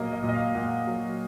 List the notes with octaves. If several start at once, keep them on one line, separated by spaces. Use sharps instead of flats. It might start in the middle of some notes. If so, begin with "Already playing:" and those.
Already playing: A#2 F#3 A#3 D#5
D#5
A#2
D#5
F5
A#2 F#5
F#3